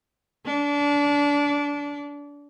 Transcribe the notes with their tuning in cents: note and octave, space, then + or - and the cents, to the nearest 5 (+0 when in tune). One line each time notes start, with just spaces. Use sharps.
D4 -25